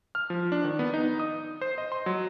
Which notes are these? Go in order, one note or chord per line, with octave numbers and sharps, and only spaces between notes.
F6
F3
D4
D#3
B3
D#4
D#6
C5
D#5
C6
F#3